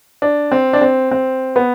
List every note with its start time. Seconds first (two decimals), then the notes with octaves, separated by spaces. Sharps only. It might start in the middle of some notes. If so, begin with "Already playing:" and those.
0.22 D4
0.52 C4
0.73 D4
0.81 C4
1.11 C4
1.56 B3